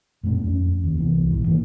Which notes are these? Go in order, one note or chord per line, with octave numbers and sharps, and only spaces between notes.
F#2 A#2 A3 C4
F2 C4 C#4
D#2
C2 E3 B3
A#1 G2 E3
A2 D#3 E3 A#3